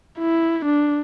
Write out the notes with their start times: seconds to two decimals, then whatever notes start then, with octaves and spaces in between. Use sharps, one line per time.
0.18 E4
0.65 D4